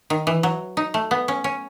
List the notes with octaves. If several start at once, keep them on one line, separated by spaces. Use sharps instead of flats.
D#3
E3
F#3
D#4
A3
B3
C#4
C#4